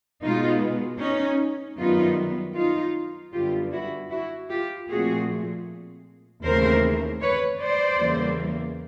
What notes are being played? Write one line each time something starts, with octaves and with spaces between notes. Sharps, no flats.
B2 G#3 B3 D#4 F4
C#4 D#4
F#2 D#3 G3 B3 D#4 F4
D#4 F4
F#2 D3 G3 B3 F4 G4
E4 F#4
E4 F#4
F4 G4
A#2 F3 A3 C4 F#4 G#4
D#2 C#3 E3 A3 C4 A#4 C5
B4 C#5
C5 D5
E2 C#3 E3 G3 A#3